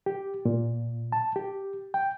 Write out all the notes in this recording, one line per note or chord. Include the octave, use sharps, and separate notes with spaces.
G4
A#2
A5
G4
G5